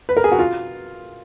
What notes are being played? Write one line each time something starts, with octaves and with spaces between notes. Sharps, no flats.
B4
A#4
G#4
F#4
F4